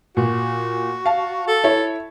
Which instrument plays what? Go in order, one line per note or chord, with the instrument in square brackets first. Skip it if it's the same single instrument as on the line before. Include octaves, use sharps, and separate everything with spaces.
[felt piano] A#2 [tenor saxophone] F#4
[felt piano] F5 A5
[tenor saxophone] A4
[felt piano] E4 C#5 E5